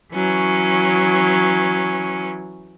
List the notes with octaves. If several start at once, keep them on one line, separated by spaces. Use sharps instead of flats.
E3 F#3 C#4